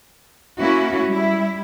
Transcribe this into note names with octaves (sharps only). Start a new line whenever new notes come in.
A#3 C#4 E4 F#4
G3 E4